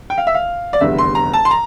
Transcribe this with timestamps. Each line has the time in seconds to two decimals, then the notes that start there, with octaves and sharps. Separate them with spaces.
0.10 G5
0.18 F5
0.27 E5
0.34 F5
0.73 D5
0.81 F1 E2 D3 G3 E5
0.98 C6
1.15 A#5
1.34 A5
1.45 C6
1.51 A#5